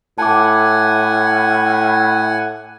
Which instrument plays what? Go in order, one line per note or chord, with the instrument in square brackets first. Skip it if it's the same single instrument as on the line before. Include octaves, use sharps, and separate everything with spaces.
[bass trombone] A2 [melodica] F#5 G#5 [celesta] A5 D6